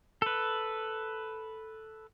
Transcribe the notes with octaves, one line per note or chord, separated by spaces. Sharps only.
A4 B4